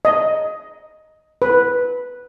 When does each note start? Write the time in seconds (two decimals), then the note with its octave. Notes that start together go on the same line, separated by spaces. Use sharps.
0.05 D#5
1.42 B4